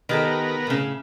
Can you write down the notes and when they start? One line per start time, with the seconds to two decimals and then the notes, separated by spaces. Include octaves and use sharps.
0.09 D#3 B3 G4 A4 A#4
0.67 A2 C#3